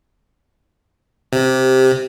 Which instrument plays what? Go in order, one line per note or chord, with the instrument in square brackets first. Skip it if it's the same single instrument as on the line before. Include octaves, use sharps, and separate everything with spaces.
[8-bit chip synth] C3 [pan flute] G4